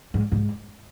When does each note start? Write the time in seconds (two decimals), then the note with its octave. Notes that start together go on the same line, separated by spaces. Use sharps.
0.14 G#2
0.32 G#2